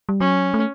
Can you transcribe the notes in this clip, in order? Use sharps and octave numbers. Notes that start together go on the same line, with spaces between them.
G3
F#3 C#4
A3